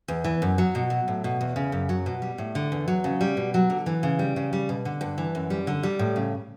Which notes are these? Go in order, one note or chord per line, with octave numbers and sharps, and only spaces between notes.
E2
E3
F#2
F#3
B2
F#3
A2
B2
E2
C#3
F#2
F#3
B2
G3
A2
D3
E2
F#3
C#3
G3
B2
F#3
D3
E3
C#3
G3
C#3
G3
B2
D3
G2
E3
F#2
G3
D3
G3
A2
C#3